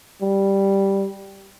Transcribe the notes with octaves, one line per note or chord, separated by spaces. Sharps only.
G3